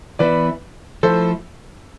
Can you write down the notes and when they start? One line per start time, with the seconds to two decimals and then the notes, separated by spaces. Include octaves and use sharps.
0.19 E3 B3 E4 B4 D5
1.03 F3 A3 E4 A4 C5